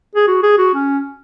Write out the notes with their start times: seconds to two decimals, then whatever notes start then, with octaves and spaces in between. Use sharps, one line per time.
0.15 G#4
0.27 F#4
0.43 G#4
0.58 F#4
0.74 C#4